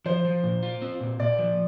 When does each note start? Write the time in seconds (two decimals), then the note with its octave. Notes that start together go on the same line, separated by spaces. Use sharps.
0.06 F3 C5
0.25 F3
0.44 A#2
0.63 F4
0.82 C4
1.00 A#2
1.20 A#2 D5
1.39 F3